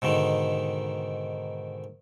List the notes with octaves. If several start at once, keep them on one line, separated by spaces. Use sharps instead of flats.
G#2 B2 D3 D#3